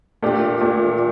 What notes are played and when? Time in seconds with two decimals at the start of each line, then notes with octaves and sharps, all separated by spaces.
0.22 A#2 A3 D4 G4
0.61 A#2 A3 D4 G4